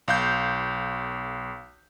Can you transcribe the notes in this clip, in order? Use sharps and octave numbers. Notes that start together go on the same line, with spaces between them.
B1 F5 G6